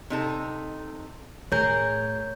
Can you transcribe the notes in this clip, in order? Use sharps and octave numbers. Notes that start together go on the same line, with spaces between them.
C3 D#4 A4
A2 G#4 A#4 C#5 G6